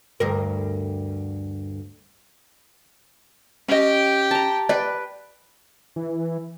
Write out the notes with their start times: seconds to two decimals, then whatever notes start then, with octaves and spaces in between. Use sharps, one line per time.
0.20 D2 G2 A#4
3.68 C#4 G4 D#5 G5
4.31 A5 A#5
4.69 B4 D5 G5
5.96 E3